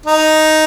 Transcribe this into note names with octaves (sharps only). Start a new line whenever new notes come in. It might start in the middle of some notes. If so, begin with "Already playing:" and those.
D#4